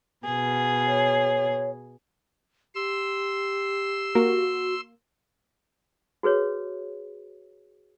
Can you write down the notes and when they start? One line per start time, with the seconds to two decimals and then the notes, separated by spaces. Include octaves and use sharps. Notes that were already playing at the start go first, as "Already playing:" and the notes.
0.24 B2 G#4
0.87 C#5
2.75 G4 C6 E6
4.15 A#3 F#4
6.23 F#4 G#4 B4 C#5